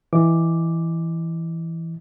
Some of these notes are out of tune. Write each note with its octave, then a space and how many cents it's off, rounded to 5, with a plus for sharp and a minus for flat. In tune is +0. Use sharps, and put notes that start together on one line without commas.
E3 +0 D#5 +0 D6 +0